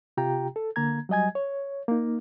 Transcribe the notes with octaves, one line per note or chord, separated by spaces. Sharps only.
C3 F4 G4 G5 A#5
A4
D3 A#3 A#5 G#6
F#3 G3 D#5 G#5 G#6
C#5
A#3 D#4